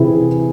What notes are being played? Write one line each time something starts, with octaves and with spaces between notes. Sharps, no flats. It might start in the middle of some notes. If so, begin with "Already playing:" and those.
Already playing: C3 E3 C4 E4 G#4